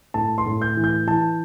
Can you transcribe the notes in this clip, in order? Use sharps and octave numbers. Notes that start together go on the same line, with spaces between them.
A2 A5
C6
A2
G6
E3
G6
E3 A5